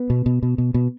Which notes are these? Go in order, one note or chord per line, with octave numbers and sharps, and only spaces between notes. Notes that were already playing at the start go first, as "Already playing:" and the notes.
Already playing: B3
B2
B2
B2
B2
B2